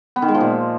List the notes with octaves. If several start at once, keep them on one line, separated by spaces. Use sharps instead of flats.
B3
D#3
G#3
F3
A#2